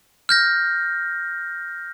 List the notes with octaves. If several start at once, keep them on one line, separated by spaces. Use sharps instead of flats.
F6 G6 A#6